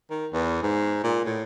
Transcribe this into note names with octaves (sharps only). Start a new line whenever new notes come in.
D#3
E2
G#2
A#2
A2